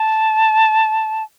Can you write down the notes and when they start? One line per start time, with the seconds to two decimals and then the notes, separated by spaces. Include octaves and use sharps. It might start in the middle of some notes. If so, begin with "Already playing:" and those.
Already playing: A5